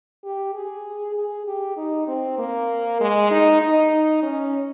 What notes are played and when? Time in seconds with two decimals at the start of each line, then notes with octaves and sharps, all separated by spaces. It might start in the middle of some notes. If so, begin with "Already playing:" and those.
0.24 G4
0.54 G#4
1.16 G#4
1.47 G4
1.77 D#4
2.08 C4
2.39 A#3
3.01 G#3
3.31 D#4
3.61 D#4
4.23 C#4